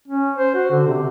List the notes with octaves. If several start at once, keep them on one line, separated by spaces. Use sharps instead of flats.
C#4
C5
F#4
D3
C3